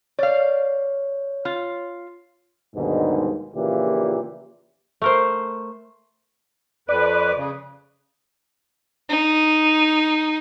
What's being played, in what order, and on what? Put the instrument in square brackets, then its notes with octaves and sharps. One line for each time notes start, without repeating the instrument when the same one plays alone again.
[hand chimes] C#5 [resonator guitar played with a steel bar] D5 F5
[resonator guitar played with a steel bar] F4
[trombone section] D#2 G#2 B2 D3 G3 G#3
A#1 A#2 C#3 E3 A#3 G4
[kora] A3 A#4 C5
[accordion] F2 B4 [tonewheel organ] D5
[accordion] C#3
[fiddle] D#4